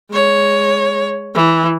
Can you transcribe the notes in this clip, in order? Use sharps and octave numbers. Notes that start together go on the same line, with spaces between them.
G#3 C#5
E3